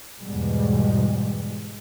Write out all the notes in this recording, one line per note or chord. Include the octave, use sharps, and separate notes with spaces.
E2 G#2 B2 G3 G#3